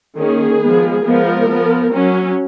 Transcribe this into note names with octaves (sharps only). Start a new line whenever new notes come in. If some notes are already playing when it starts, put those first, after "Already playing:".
D#3 A#3 C#4 G#4
F3 G#3 B3
F3 G#3 B3 A#4
F3 B3
F#3 C#4